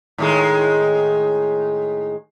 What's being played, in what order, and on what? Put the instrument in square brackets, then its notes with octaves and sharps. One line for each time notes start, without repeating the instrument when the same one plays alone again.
[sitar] A2 D#3 G#3